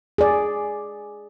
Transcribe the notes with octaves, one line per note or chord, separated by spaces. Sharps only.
G#4 D5